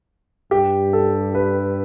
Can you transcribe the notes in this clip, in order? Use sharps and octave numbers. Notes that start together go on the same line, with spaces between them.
G2 G4
A4
B4